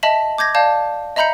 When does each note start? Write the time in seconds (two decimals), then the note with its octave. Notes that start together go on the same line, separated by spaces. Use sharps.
0.03 D#5 E5 A5 B6 F#7
0.38 D6 G6 G#6 A#6
0.55 D5 F5 A5 G6
1.16 D#5 E5 A#5 B5 G6 C#7